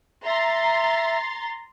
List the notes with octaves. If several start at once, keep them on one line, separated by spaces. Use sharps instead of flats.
E5 A#5 C6 A6